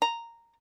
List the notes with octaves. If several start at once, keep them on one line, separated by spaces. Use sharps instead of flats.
A#5